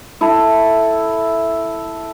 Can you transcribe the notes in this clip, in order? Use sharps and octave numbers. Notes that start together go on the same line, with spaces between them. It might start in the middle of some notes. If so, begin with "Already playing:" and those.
E4 A4